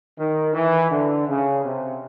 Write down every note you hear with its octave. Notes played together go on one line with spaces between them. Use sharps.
D#3
E3
D3
C#3
C3